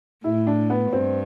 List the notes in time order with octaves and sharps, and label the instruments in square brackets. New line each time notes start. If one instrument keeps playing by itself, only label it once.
[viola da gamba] A2 [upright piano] E4
[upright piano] D4
B3
[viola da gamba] G2 [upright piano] C4